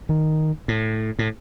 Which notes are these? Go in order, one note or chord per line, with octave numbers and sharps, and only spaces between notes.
D#3
A2
A2